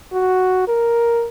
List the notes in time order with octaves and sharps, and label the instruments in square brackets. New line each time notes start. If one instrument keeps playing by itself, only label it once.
[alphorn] F#4
A#4